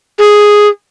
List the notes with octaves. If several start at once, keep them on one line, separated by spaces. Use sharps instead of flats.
G#4